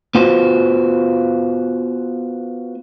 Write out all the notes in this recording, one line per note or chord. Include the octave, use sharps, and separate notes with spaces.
B3 F4 F#4 C5